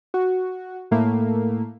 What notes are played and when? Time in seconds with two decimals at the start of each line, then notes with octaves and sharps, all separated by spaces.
0.14 F#4
0.91 A2 A3 A#3